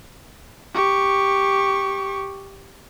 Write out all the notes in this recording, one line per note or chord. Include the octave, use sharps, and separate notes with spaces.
G4 C#6